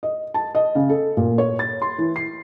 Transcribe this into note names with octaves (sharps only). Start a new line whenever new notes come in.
D#5
A5
D#5
C#3
A4
A#2
C#5
A6
C6
E3
C7